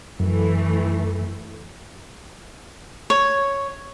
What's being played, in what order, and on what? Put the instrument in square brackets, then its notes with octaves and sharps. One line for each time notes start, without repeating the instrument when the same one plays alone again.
[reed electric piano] F#2 [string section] E3 A3
[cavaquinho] C#5